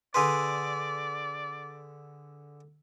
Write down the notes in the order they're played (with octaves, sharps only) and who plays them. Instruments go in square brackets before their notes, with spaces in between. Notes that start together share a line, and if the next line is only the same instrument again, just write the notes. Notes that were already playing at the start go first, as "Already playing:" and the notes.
[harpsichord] D3 G#4 B4 [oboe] D5 [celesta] C6